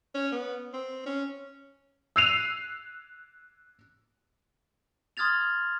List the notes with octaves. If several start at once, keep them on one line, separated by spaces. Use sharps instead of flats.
C#4
B3
C4
C#4
E6 F#6 C7 D#7 F7
C6 D#6 F6 G#6 A6 F7